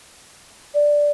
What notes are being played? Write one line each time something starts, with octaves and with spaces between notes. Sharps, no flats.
D5